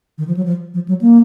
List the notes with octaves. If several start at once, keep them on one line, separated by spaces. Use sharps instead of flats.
D#3
F3
F#3
F3
F3
F#3
A#3